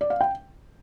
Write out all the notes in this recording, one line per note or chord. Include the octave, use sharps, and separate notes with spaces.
D5
F5
G5